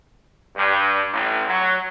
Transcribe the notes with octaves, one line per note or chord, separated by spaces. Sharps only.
G2
A1
F#3